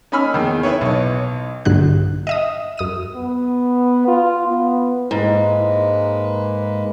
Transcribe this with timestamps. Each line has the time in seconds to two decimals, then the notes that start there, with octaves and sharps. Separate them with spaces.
0.12 C#4 D#4 G#5 B5 E6 F6
0.34 E2 D#3
0.63 E4 B4 C#5
0.81 B1 C#5
1.65 A#1 G2 D3 F#3 F#6
2.27 D#5 E5 D#6
2.78 F#2 D#6 D#7
3.15 B3
4.08 F4
4.47 B3
5.11 G#2 G#3 A#3 B4